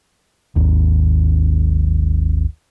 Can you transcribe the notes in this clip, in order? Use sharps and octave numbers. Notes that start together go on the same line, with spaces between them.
G#1 D#2